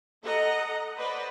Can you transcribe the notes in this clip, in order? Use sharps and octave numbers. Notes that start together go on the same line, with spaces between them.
A4 D#5 F#5 A#5
B4 C5 D5 D#5 F#5 B5